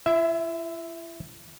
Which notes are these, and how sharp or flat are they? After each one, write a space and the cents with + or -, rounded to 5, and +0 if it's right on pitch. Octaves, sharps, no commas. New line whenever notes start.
E4 +45 E5 +0